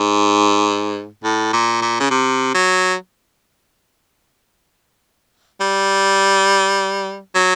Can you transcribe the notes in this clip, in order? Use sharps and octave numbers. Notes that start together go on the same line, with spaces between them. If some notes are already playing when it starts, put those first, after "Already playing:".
Already playing: G#2
A2
A#2
A#2
C#3
C3
F#3
G3
F#3